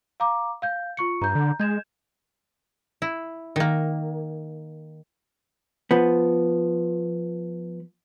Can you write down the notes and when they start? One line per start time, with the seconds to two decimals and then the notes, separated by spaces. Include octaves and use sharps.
0.20 F5 A#5 D6
0.62 F5 G6
0.97 F4 C#6 C#7
1.22 G2 A#5 G6
1.35 D3
1.60 G#3 G6 G#6 E7
3.02 E4
3.56 D#3 A#3
5.91 F3 B3